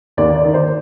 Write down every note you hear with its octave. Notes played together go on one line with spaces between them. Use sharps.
D#2 D5
D5
D#3
C5